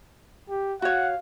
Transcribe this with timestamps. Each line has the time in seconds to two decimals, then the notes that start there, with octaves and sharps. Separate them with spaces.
0.49 G4
0.82 F#4 C#5 F5 F#5